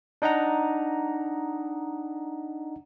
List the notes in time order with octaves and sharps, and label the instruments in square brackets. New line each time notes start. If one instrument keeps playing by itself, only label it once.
[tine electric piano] D4 D#4 D#5 F#5 A#5